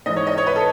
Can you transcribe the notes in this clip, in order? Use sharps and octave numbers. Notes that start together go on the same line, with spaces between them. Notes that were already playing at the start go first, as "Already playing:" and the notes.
G#1 G#2 E3 D#5
C#5
D#5
C#5
B4
A4